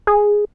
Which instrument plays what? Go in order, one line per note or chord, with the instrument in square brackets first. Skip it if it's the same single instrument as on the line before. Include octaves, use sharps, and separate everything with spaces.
[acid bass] G#4